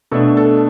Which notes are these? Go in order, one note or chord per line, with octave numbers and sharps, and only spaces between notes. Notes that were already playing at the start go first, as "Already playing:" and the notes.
B2 A3 D4 A4
A4